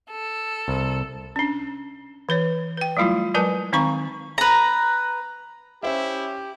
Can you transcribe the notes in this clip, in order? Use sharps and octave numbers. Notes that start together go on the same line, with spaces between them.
A4
C2
C#4 D4
E3 B4 C#5
B4 G5
F#3 G3 A3 E4 F4
F#3 G#3 A#4 B4 G#5 A5
D#3 C4 D#4 F5 A#5 C#6
B4 A#5
C#4 E4 G4 C5 E5